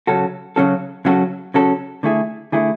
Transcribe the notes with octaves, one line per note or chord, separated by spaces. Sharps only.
C#3 F#3 C#4 F#4 A4
C#3 F#3 C#4 F#4 A4
C#3 F#3 C#4 F#4 A4
C#3 F#3 C#4 F#4 A4
D3 A3 E4 G#4
D3 A3 E4 G#4